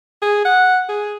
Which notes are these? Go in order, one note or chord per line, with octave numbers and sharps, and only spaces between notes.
G#4
F#5
G#4